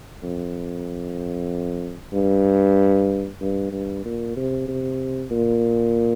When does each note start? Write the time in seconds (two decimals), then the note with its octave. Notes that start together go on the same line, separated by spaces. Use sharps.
0.23 F2
2.13 G2
3.41 G2
3.72 G2
4.05 A#2
4.36 C3
4.68 C3
5.31 A#2